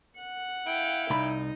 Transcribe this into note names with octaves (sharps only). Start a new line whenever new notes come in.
F#5
E4 F5 G5
C2 D#4 B5